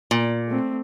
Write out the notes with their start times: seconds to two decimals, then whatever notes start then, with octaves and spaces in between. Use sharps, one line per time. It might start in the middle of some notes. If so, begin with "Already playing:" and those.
0.11 A#2
0.48 A3 C4